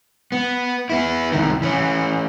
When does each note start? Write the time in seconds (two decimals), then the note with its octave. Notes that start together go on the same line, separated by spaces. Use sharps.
0.32 B3
0.90 B3 E4
1.32 C2 D#3
1.62 E3 C#4